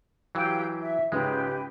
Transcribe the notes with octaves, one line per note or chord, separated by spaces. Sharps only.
E3 F#3 G4 F5 G5
E5
C#2 G#2 C#3 G#3 G4 B4